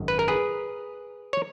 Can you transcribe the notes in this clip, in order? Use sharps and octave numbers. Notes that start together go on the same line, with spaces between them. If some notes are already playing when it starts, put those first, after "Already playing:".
Already playing: G#1 F#2 D#3
B4
A#4
G#4 B4
C#5